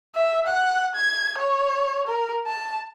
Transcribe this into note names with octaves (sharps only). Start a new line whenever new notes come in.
E5
F#5
G#6
C#5
A#4
A5